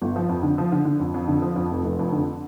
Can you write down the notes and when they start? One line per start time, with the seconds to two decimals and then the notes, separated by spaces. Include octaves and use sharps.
0.02 G1
0.16 F3
0.29 F2
0.43 D3
0.58 F3
0.72 D3
0.85 D3
1.00 F2
1.14 F2
1.28 D3
1.42 F3
1.56 F2
1.71 F1
1.84 F1
1.99 F2
2.12 D3